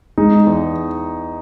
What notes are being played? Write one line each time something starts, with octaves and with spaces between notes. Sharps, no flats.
G#3 D#4
E2